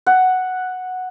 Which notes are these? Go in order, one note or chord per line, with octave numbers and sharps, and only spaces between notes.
F#5